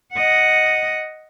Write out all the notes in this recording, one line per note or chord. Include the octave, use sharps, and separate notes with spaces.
D#5 F#5